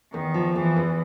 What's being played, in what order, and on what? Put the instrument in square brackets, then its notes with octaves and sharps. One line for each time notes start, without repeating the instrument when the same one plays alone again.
[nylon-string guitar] E2 [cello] D#3
[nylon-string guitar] F3
[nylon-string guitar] E2 [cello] E3
[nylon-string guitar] E2